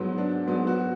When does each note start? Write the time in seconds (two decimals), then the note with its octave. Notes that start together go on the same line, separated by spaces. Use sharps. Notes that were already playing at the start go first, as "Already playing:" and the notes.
Already playing: G#2 F#3 B3
0.18 D4
0.47 G#2 F#3 B3
0.67 F#4